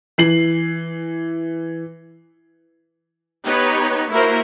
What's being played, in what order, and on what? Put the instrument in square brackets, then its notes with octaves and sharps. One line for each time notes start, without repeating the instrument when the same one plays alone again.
[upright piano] E3 C7 F#7
[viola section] B3 D#4 G4 B4 C#5
A#3 E4 F#4 A#4 C5